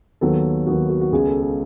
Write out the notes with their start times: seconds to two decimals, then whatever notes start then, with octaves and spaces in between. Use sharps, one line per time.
0.21 D#2 D#3 F#3 B3 A4
0.67 D#2 D#3 F#3 B3 F#4
0.90 F#4
1.01 F#4
1.12 C#2 C#3 G#3 B3 G#4
1.28 A4
1.43 A4